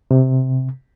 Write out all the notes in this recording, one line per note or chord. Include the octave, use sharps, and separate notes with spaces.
C3